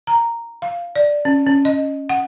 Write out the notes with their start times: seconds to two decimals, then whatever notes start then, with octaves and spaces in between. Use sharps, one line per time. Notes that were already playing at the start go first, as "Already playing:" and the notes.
0.07 A#5
0.62 F5
0.96 D5
1.25 C#4
1.46 C#4
1.65 D#5
2.09 F#5